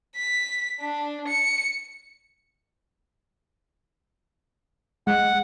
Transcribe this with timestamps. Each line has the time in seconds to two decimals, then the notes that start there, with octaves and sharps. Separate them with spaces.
0.16 B6
0.81 D4
1.28 C#7
5.07 G#3 F#5